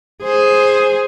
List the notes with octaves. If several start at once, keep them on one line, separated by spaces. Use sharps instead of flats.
G#4 C5